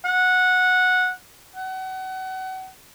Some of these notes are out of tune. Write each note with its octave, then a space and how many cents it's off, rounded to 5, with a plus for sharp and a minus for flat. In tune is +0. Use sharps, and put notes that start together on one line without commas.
F#5 -15
F#5 +30